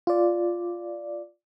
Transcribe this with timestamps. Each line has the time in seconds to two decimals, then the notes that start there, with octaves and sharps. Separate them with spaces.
0.07 F4 D5